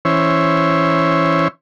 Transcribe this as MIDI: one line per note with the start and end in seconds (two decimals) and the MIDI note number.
0.05 1.48 52
0.05 1.48 61
0.05 1.48 72
0.05 1.48 73
0.05 1.48 76